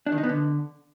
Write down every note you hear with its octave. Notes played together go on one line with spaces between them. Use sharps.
D4
D#3
D#4
B3
D3